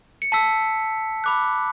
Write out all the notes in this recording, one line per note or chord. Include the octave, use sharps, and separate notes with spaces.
C#7
A5 E6 B6
B5 D6 F#6